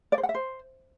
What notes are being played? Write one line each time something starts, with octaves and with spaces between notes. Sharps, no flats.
D5
C5
F#5
E5
C5